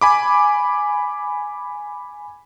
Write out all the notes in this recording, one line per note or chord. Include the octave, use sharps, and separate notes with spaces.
G#5 B5 D6